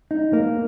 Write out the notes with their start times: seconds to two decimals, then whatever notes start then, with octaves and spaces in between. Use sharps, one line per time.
0.11 D#4
0.33 A#3